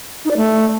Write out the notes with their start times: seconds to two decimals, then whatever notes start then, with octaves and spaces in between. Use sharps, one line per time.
0.25 D#4
0.31 D5
0.36 A3